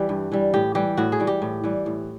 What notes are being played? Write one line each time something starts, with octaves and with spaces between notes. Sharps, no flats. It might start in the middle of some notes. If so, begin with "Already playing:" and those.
Already playing: E3 G3 G4
G2
E3 G3
A2 G4
E3 G3 G4
A2 F#4
G#4
E3 G3
G4
A2
E3 G3
A2